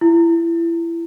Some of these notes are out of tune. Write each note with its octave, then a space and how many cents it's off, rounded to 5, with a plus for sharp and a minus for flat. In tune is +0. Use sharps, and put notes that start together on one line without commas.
E4 +25